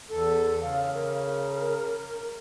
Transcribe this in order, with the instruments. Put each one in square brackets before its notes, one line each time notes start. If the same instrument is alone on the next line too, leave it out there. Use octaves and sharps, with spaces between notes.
[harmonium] E2 A4
[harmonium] C#3 [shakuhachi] F5
[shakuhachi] A#4